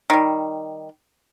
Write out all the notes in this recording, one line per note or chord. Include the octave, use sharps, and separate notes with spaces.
D#3 G3